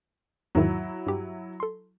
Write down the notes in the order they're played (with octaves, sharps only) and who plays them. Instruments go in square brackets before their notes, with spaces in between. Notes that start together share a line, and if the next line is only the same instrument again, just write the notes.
[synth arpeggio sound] E2 G#2 D#3 [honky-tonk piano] F#3 E4
[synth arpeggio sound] G2 G4
A4 C6